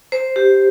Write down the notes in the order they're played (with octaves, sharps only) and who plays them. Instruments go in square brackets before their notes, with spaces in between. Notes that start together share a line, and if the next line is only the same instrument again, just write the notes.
[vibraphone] C5
G4